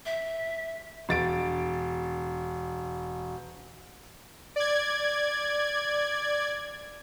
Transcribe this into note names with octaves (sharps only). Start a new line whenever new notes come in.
E5
E1 A6 D7
D5 G#6